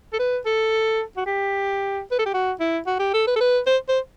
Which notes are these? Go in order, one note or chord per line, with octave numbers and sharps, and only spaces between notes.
A4
B4
A4
F#4
G4
B4
A4
G4
F#4
E4
F#4
G4
A4
B4
A4
B4
C5
C5